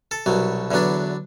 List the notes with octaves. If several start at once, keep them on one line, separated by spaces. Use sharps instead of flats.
A4
C2 B2 F#3
E2 D3 F#3 B3 D4